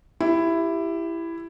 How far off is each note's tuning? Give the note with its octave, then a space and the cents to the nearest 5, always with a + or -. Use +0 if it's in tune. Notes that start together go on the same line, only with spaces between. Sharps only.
E4 +10 G4 +0